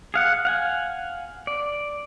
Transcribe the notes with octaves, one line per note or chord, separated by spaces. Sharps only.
G#4 F5 F#5
F5 F#5 G#5
D5